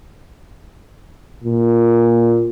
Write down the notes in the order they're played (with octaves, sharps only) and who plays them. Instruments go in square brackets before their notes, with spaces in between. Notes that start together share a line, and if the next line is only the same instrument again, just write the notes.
[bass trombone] A#2